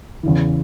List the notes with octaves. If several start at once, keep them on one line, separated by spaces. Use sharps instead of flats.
E2 C#3 E3